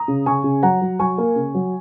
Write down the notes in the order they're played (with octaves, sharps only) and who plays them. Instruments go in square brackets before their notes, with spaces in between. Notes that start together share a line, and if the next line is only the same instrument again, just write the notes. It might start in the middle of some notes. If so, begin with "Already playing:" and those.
Already playing: [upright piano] A#5 D#6
C#3
C#3 G#5 C#6
C#3
F#3 F#5 A#5
F#3
F#3 G#5 C#6
A#3
C#3
F#3